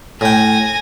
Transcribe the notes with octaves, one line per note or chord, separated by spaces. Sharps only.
A2 G5 G#5 A#6